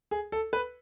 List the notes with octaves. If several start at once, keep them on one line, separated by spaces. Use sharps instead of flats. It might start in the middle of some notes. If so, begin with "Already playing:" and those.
G#4
A4
B4